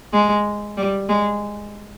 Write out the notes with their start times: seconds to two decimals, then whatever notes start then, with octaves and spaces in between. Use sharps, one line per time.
0.13 G#3
0.77 G3
1.09 G#3